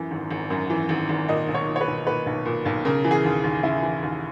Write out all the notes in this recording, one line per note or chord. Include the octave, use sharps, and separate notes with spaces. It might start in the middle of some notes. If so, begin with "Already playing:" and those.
Already playing: F#2 E3
G#1
G#1
F#2
E3
G#1
G#1
A#2 D#5
B1
C#5
A#2
C#5
B4
B1
A#2 B4
B1
A#2
B1
C#3 A#4
E3
G#4
D#2
D#2
C#3 E4
E3
D#2